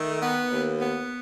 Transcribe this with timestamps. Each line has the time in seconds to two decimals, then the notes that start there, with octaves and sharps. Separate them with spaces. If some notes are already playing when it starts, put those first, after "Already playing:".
Already playing: D#3 A3
0.21 B3
0.51 D#2
0.79 B3